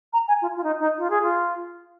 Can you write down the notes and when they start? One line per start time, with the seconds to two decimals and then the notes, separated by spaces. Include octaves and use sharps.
0.13 A#5
0.28 G#5
0.42 F4
0.56 F4
0.64 D#4
0.80 D#4
0.98 F4
1.10 G#4
1.22 F4